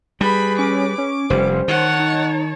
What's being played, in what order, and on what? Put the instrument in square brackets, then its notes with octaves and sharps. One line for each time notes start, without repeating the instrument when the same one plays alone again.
[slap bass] G3 [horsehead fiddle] G#4 B4 [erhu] B5
[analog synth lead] C#4 [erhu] D6
[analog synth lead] C#4
[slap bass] F1 [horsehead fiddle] G3 C#4 [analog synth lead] C5
[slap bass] D#3 [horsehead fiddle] C#5 A5 [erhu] F#5
[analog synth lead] D#4